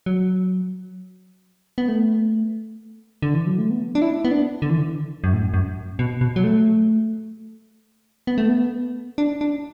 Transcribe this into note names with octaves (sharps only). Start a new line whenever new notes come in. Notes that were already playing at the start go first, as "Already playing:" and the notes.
F#3
B3
A3
D3
E3
F#3
A3
B3
D4
E4
B3
D4
D3
E3
D3
F#2
A2
F#2
F#2
B2
B2
F#3
A3
B3
A3
B3
D4
D4